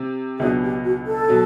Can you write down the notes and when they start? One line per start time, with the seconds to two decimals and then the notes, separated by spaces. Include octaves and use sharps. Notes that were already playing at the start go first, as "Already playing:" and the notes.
Already playing: C3 C4
0.39 C#2 B2 F#3 B3 D4 G#4
0.62 G4
0.84 F#4
1.06 A4
1.29 B2 F#3